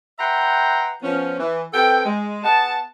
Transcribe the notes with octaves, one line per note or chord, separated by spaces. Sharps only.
B4 E5 F#5 G5 A#5 C6
F3 B3 C#4
E3
C4 A4 B4 G5
G#3
B3 G#4 F#5 A5